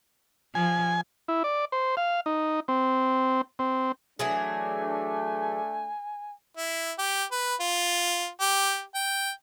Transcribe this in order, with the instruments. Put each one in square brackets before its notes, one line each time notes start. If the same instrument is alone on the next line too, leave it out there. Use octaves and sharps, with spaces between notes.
[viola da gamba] F3 [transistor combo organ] G#5
[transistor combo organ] E4
D5
C5
F5
D#4
C4
C4
[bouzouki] E3 F#3 G#4 [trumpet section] A3 D4 [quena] G#5
[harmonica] E4
G4
B4
F4
G4
G5